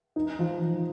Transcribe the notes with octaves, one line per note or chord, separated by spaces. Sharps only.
D#4
F3
F3